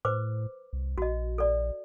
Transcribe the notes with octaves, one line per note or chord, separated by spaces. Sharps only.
A2 B4 C5 D6
C2
A#1 F#4 D#5
A4 D5